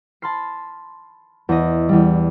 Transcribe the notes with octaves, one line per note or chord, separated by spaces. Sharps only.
A5 B5 C6 F6 C7
E2 D#5
E2 E3 G3